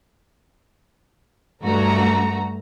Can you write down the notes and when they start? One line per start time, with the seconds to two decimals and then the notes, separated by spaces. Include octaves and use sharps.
1.63 G2 A3 F#4 A#5